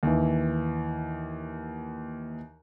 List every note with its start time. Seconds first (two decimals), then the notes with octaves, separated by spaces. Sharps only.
0.03 D#2 E3